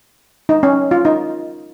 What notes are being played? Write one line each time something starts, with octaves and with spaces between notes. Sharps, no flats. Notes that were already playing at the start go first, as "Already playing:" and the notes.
D#4
C#4
F4
D#4